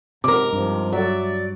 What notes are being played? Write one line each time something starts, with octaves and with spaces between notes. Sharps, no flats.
G#2 C3 F#3 A#4 D6
G2 C3 F3
F#3 D5 E5